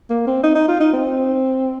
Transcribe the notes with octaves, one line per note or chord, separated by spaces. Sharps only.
A#3
C4
D#4
D#4
F4
D#4
C4